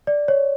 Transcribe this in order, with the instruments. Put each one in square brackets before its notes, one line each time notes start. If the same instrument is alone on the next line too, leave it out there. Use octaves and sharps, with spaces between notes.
[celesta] D5
C#5